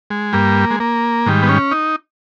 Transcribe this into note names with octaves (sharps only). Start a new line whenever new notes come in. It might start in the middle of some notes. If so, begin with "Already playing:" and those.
G#3
G2 G3 A#3
G#3
A#3
G#2 D#3 G3
B3
C#4
D#4